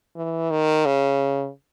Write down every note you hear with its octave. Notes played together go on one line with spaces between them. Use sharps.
E3
D#3
C#3